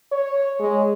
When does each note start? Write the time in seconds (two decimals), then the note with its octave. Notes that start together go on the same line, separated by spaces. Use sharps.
0.12 C#5
0.60 G#3